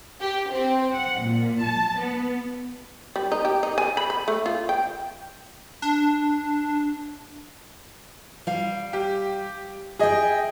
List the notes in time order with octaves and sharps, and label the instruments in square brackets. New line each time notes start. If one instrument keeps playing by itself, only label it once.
[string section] G4
C4
F#5
A#2
A5
B3
[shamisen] G3
D#4
G4
D#4
G#5
B5
B5
A3
F4
G5
[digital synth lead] D4
[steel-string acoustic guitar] G3 F5
[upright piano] G4
[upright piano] G#4 D#5 [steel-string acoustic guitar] E5 G5